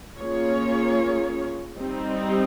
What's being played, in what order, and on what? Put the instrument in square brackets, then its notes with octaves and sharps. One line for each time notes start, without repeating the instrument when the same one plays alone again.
[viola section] A#3 C#4 F4 G#4 C#5
G3 C4 D#4